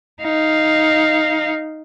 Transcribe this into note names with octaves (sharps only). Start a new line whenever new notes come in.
D#4 F5